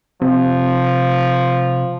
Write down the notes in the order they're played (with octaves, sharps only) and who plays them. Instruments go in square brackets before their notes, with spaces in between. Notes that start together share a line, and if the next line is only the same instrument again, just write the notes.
[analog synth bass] C3 [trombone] F3